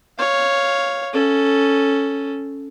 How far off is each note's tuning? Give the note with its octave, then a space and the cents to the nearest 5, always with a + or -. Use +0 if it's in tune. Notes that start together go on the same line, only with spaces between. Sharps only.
C#5 +0 F5 +0
C#4 +0 A4 +0